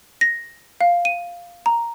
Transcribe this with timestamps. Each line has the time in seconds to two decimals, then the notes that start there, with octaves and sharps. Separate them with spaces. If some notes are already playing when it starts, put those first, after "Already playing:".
0.21 A#6
0.80 F5
1.05 D#7
1.66 A#5